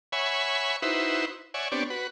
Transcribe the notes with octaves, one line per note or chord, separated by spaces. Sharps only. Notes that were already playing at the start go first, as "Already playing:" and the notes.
C#5 E5 F#5 G#5 B5
D#4 E4 F#4 B4 C5 E5
C#5 D5 E5 F#5 G#5
B3 C4 D4 G4 C#5 D5
F#4 B4